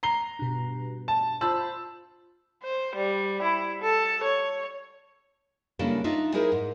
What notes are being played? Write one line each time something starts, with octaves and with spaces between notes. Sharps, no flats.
A#5 C7 G7
G2 B2
A5
F4 C5 A5 B5 E6
C5
G3
E4
A4
C#5
C#3 G3 A#3 D4 E4 A4
D4 D#4 F4 E5
D#4 E4 G#4 A#4 C5
G#2